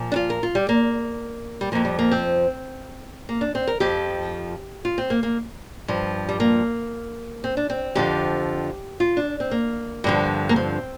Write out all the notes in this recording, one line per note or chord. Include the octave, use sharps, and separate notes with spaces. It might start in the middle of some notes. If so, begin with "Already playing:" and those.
Already playing: A#2 F3
D4
F4
A#4
F4
G3
A#3
G3
F2 F3 A#3
G3
A#3
C4
A#3
D4
C4
A#4
F2 F3 G4
F4
C4
A#3
A#3
G2 F3
G3
A#3
C4
D4
C4
F2 D3 F3 G4
F4
D4
C4
A#3
G2 D3 F3
A#3
C4